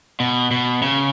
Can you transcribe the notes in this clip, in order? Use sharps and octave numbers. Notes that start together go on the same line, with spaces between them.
B2
B2
C#3